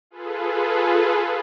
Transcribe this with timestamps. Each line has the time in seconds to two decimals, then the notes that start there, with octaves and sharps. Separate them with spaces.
0.10 F4 G#4 A4 B4